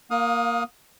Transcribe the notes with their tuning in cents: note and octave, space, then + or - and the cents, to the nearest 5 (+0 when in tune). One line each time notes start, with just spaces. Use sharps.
A#3 +0 F5 +30 D#6 +0